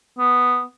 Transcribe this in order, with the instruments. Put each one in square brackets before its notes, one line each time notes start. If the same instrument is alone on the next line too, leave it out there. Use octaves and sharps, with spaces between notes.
[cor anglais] B3